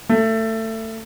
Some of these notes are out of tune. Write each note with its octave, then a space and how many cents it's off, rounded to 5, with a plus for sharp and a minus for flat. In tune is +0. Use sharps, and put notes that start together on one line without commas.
A3 +20